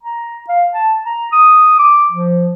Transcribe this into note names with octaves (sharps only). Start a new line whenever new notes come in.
A#5
F5
A5
A#5
D#6
D6
F3